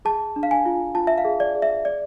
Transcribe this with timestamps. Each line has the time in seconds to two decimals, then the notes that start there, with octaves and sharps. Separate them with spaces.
0.05 G#4 A5
0.36 D4
0.43 F5
0.51 G#5
0.66 F4
0.95 F4 A5
1.07 E5
1.18 F5
1.25 G#4
1.40 D5
1.55 G#4
1.62 E5
1.85 D5